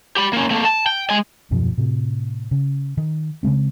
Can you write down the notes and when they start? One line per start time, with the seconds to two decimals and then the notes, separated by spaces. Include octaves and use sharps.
0.16 G4 B5
0.33 A#3 C#4
0.50 A3 A#3
0.65 A5
0.86 G5
1.10 G#3 G#5
1.51 D#1 F#2 B2 F3
1.78 A2 C3
2.51 C#3
2.97 D#3
3.43 C#3 F#3 G#3 C4